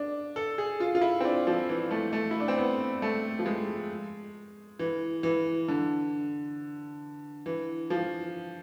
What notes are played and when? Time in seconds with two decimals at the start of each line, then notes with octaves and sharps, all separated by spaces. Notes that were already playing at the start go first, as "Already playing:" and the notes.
Already playing: D4
0.36 A4
0.58 G#4
0.80 F4
0.95 F4
1.01 E4
1.20 C4
1.25 D4
1.47 F3
1.69 E3
1.91 A3
2.13 A3
2.31 E4
2.40 D4
2.48 C4
2.58 B3
3.02 A3
3.39 F3
3.46 G#3
4.79 E3
5.23 E3
5.68 D3
7.46 E3
7.90 F3